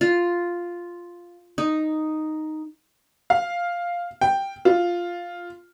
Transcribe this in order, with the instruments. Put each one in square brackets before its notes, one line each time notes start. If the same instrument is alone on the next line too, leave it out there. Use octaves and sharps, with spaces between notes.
[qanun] F4
D#4
[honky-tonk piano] F5
G5
F4